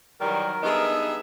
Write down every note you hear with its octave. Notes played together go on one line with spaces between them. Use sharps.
D#3 E3 F#3 G3 A#4
G2 B3 D#4 G#4 E5